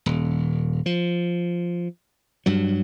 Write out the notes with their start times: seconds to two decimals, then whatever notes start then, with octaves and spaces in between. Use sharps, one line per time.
0.06 D#1
0.86 F3
2.46 G2 F#3